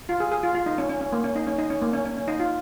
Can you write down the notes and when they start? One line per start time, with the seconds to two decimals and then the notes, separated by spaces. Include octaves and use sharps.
0.09 F4
0.20 G#4
0.32 G#4
0.43 F4
0.55 F4
0.66 D#4
0.78 C#4
0.89 C#4
1.01 C#4
1.12 A#3
1.24 C#4
1.36 D#4
1.47 C#4
1.58 D#4
1.70 C#4
1.82 A#3
1.93 C#4
2.05 C#4
2.17 C#4
2.28 D#4
2.40 F4